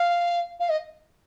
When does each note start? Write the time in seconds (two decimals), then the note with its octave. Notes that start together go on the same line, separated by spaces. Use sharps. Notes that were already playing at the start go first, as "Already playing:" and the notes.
Already playing: F5
0.59 F5
0.69 D#5